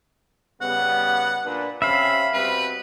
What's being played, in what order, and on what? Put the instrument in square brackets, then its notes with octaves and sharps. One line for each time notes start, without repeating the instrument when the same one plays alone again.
[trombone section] C#3 G3 B3 [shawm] F#5
[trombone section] A#2 D4 B4
[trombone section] C3 C4 C#4 [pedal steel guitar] E5 F5 [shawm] B5
[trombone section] B2 G3 C4 [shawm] B4